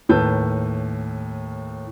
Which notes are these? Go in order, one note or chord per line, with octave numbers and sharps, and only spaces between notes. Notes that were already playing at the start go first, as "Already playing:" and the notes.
D#2 A2 B4 A5 E6 G6